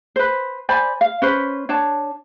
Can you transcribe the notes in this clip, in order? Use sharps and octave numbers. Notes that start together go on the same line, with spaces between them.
B4 C5
C5 D5 G#5 B5
F5
C#4 B4 C5
D4 C#5 A5